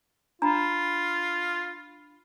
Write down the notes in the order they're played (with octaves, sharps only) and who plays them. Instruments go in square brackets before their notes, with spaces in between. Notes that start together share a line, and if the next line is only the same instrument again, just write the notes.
[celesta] D4 B5 [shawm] F4 [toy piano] A#5